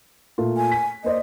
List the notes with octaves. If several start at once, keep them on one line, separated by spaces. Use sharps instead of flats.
A#2 A3 F4
G#5
B6
A#3 C5 D5 D#5